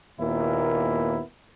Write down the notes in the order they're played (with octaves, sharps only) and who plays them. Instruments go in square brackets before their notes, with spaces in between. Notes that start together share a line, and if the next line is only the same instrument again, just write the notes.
[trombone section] D#2 A#2 B3 E4 A#4